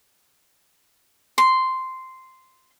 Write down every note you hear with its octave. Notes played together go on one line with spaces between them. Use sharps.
C6